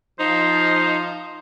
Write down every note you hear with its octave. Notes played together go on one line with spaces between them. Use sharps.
F3 D#4 C5